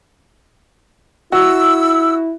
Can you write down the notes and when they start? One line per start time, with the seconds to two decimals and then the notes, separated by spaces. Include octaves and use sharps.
1.32 E4 F#4 E6